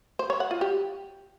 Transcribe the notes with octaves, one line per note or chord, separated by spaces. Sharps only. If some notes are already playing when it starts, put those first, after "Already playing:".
C5
C#5
F#5
F4
G4